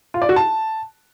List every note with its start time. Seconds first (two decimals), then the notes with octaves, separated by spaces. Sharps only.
0.14 F4
0.22 D5
0.29 F#4
0.36 A5